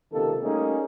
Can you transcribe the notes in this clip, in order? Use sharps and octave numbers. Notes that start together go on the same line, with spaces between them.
C#2 C3 D#3 A#3 A4
G3 A3 A#3 C#4 D#4 G#4